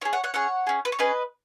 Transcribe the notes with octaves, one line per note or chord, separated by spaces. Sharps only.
C#4 G#4 C#5
C#5 F#5
C#5 F#5
C#4 G#4 C#5 F#5
C#4 G#4
B4
C#5
C#4 G#4 B4 D#5